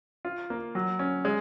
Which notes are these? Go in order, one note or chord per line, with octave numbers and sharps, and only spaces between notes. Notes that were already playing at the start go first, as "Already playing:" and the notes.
F4
A#3
F#3
C#4
G#3